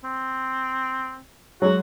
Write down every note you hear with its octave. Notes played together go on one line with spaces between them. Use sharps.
C4
F#3 G#3 F#4